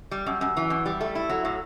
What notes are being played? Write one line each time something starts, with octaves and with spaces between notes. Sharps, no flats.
G3
F#2
F#2
E3
F#2
G3
A3
E4
F#3
A2